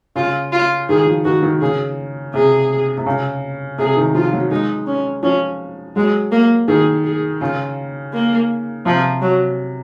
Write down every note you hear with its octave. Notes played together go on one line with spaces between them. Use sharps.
C#3 F4
F4
D#3 G#4
F3
D#3 F#4
D#3
C#3 G#4
C3 G#4
C3
C#3
C3 G#4
D#3
F3 F4
F#3
G#3 D#4
C#4
F3 C#4
F#3 G#3
A#3
D#3 G#4
G#4
C#3 F4
A#3
C3 F3
F#3